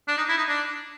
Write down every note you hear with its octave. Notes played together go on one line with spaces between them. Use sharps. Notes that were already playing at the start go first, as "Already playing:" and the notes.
D4
D#4
E4
D#4
D4